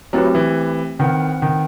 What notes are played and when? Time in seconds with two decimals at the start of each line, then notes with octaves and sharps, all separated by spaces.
0.13 F#3 A3 C4 E4 G4 B4
0.35 E3
0.99 D#3 C4 E4 B4 F#5
1.42 D#3